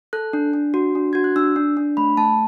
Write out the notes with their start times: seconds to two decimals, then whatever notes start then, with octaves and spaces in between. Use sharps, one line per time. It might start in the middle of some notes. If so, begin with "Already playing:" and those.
0.13 A4 F#6
0.33 D4
0.53 D4
0.74 F#4
0.95 D4
1.13 F#4 G#6
1.24 F#6
1.36 D4 E6
1.56 D4
1.77 D4
1.97 A3 B5
2.17 A3 A5